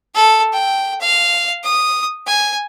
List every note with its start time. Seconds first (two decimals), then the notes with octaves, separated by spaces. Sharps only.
0.15 A4
0.53 G5
1.01 F5
1.64 D#6
2.27 G#5